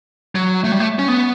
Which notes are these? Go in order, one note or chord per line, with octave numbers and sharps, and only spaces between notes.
F#3
A3
G3
A3
C#4
B3